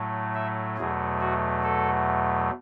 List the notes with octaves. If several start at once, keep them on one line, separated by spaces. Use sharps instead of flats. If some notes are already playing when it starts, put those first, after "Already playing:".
Already playing: A2 F#3 A3
E5
E2 B2 F#3 A3 G#4
F#4
A4